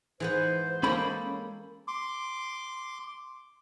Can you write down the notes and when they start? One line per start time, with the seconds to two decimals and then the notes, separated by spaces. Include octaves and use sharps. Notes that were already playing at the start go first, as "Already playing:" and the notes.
0.20 G#2 E3 B3 B4 C5
0.83 G#3 A#3 C#4 A4 B5
1.88 C6 D6